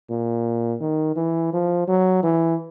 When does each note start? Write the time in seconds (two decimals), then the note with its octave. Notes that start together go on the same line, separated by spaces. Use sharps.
0.10 A#2
0.81 D#3
1.16 E3
1.53 F3
1.88 F#3
2.23 E3